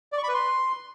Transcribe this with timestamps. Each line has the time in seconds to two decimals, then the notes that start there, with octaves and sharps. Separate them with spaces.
0.12 D5
0.18 C#6
0.23 B5
0.29 B4
0.34 C6